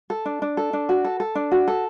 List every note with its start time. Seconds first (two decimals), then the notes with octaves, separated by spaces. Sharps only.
0.10 A4
0.25 D4
0.42 D4
0.57 A4
0.73 D4
0.89 F#4
1.05 A4
1.20 A4
1.35 D4
1.51 F#4
1.68 A4